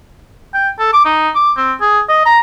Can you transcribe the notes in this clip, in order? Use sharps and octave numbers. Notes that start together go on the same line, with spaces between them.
G5
A4
D6
D#4
D6
C4
G#4
D#5
A#5